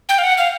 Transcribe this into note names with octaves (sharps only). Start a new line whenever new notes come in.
G5
F5
F#5
F5